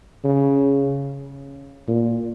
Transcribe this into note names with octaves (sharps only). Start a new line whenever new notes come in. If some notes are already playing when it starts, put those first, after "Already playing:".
C#3
A#2